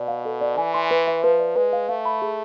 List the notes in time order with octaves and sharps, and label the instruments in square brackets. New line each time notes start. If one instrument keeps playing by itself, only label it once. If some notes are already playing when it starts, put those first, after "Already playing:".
Already playing: [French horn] B2 [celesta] D5
[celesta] F5
A4
D5
[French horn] E3 [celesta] G#5
[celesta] C6
B4
E5
[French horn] F3 [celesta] B4
[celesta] D5
[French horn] G#3 [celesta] B4
[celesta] F5
[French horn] A3 [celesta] F5
[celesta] B5
G#4